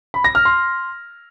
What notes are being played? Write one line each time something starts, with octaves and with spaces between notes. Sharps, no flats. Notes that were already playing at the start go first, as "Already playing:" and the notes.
B5
A#6
F6
C6